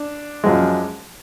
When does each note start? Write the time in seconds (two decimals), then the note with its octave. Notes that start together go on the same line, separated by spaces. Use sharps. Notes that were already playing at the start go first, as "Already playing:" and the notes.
Already playing: D4
0.44 F#2 F3 G#3